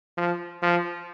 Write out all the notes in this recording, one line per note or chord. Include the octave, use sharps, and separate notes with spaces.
F3
F3